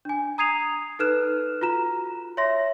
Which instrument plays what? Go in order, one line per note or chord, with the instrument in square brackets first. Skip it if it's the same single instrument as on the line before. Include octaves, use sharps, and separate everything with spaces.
[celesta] D4 G#5
A#5 D#6 G#6 C7 D#7 F7
D#4 A4 B4 F6 F#6 E7
F4 F#4 A#5 E7
C#5 E5 C6 A#6